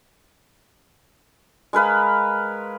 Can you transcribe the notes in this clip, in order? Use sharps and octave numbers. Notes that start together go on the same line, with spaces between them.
G#3 A#4 B4 F5